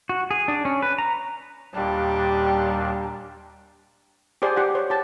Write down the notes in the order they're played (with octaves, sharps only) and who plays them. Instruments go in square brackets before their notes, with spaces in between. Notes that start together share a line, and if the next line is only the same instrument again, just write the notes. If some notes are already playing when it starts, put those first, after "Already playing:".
[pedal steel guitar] F#4
G#4
D4
C#4
B4
A#5
[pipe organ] D#2 A#2 D4 [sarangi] G3
[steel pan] G4 G#4 C5 D5 C6
G4 F#5
C5 C#5
G4 A5